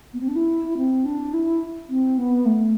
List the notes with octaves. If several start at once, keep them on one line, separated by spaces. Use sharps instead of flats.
B3
C4
D4
E4
C4
D4
E4
C4
B3
A3